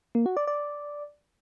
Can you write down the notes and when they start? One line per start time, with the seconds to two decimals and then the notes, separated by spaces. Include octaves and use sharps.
0.15 A#3
0.26 F#4
0.37 D5
0.47 D5